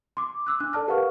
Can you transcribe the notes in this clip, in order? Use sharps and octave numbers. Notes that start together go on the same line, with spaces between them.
C6 D6
D6 E6 F#6
D4 F#6
A4 D5 A5 F6
G4 A#4 B4 F5 F#5 C#6